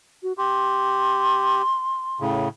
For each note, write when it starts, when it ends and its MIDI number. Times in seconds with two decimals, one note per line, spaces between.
0.23 0.33 66
0.38 1.62 67
0.38 2.22 84
2.20 2.48 45
2.20 2.48 49